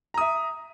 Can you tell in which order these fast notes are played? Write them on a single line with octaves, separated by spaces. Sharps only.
A#5 D#6 E5